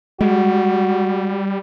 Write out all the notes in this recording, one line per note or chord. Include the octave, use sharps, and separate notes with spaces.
G3 G#3 F#4